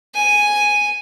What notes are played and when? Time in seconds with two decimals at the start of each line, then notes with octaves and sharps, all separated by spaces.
0.15 G#5